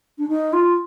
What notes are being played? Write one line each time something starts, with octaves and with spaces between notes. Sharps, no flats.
D4
D#4
F4